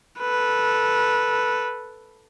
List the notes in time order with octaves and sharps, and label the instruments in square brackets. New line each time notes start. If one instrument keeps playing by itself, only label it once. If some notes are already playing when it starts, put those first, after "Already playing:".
[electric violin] A4 B4